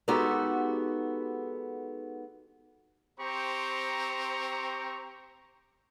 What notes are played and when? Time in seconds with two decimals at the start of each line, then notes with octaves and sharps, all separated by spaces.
0.08 G#3 B3 D#4 F#4 G4 A4
3.20 C4 G4 C5 A#5 C#6